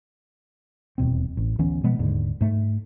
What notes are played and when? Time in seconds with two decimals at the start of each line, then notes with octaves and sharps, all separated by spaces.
0.98 D#1 E2 B2 C4
1.37 A1
1.59 D2 E3 B3 C#4
1.84 B2 F3 G#3 B3
1.99 D#1 D#2 G#2 D3
2.41 G#2 A3